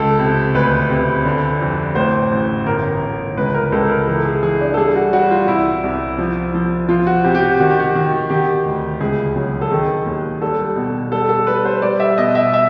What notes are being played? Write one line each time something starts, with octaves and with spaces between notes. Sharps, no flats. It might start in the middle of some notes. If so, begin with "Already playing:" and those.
Already playing: C#2 A4
C3
D2 B4
C3
D3
F2
A2 C5
A1
G1 A#4
G1
C#2 B4
A#4
C#2 A4
A#4
E3 A4
G#4
E3 G#4
D4
A4
G3 G#4
F#4
G3 F#4
F4
C2 E4
C2
F3
F3
F3 F4
F#4
C3 G4
G4
F#4
D#3 F#4
G4
F#4
D#3
D#3 G4
D2
C#2 G#4
F#3
A4
D#3 G#4
D#2
G3 A4
B2
G3 A4
A4
G3 B4
C5
G3 D5
E5
B2 D#5
E5
E5